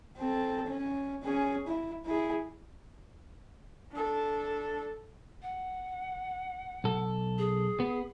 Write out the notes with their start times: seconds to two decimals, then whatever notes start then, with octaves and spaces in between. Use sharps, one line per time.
0.17 C4 A4
0.67 C#4
1.24 C#4 G#4
1.67 E4
2.05 E4 G#4
3.92 D4 A4
5.42 F#5
6.84 B1 A4
7.38 G#4
7.80 B3